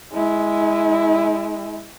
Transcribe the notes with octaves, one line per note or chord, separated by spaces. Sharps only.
G#3 E4